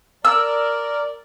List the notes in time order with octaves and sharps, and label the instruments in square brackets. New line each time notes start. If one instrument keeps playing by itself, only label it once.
[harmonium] A#4 D5 [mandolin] E6